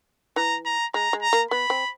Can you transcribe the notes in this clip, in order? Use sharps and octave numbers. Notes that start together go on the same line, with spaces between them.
E3 A#5
A#5
G#3 A#5
G#3
A#5
A#3
B3 B5
C4